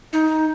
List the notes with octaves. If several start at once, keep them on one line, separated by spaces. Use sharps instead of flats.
D#4